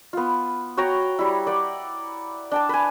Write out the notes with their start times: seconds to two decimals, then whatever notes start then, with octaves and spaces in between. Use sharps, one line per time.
0.13 B3 F4
0.77 F#4 C#5 G5 A#5
1.19 G3 E4
1.47 D5 F#5 G5
2.52 D4 G5 A5
2.69 B4 G#5